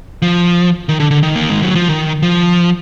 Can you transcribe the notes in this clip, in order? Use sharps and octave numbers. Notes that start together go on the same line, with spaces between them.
F3
D#3
D3
D3
D#3
A#3
G#3
F#3
F3
D#3
F3